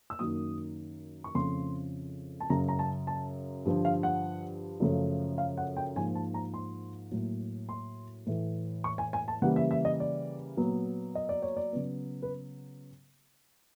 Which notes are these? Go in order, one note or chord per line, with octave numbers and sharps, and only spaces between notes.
E6
F#2 D#3 F#3 A#3 D#6
C#6
F2 C#3 F3 A3 C6
A5
F#2 C#3 F#3 A#5
A#5
A5
A5
G2 D3 F3
F5
F#5
F#2 C#3 F3 A3
F5
F#5
G5
G#2 F3 A#3 G#5
A5
A#5
C6
A2 F#3 A#3
C6
A2 E3 A3
C#6
G#5
G#5
A5
C#3 E3 G3 A#3 F#5
E5
E5
D#5
D5
A#2 F#3 B3
D#5
D5
C#5
D5
C#3 F#3 B3
B4